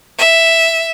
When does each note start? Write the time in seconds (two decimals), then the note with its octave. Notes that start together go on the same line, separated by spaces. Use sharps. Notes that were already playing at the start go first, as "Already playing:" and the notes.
0.18 E5